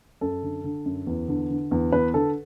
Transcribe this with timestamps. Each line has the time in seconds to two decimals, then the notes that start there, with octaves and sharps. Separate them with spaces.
0.21 F#2 A4
0.43 D3
0.64 D3
0.86 F#2
1.07 E2
1.28 D3
1.50 D3
1.71 E2
1.92 E2 B4
2.14 D3 A4